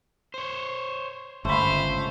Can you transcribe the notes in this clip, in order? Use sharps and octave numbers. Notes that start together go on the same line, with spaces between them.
C5 C#5
G1 C#2 A3 C5 F5 B5